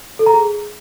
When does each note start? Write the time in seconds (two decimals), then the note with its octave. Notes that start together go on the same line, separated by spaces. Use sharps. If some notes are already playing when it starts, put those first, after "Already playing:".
0.19 A4
0.26 A#5
0.34 G#4